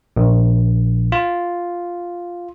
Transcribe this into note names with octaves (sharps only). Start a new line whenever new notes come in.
A#1
F4